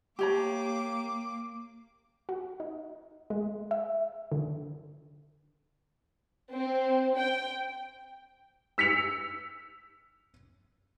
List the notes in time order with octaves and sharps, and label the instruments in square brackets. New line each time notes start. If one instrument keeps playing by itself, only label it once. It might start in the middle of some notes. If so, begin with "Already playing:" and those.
[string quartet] A#3 D6 [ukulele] G4 C#5 A#5
[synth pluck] F#4
D#4
G#3
E5
D3
[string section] C4
G5
[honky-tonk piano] E6 B6 C#7 F7